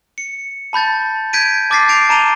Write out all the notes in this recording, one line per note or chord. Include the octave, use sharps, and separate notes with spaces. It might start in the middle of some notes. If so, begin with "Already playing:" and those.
C#7
A5 B5 G6 A6
G6 G#6 B6 D7 D#7
A5 D6 F6 A6 B6 C7
G6 A6 D7 F7
A5 A#5 D#7 F7 G7